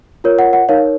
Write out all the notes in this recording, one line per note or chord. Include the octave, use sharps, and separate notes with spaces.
F4 A#4 C#5
F#5
F#5
D#4 A#4 C#5 F5